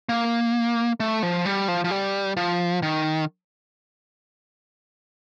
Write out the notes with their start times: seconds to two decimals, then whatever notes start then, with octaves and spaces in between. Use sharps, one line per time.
0.09 A#3
1.00 A3
1.23 F3
1.45 G3
1.68 F3
1.84 F3
1.91 G3
2.37 F3
2.83 D#3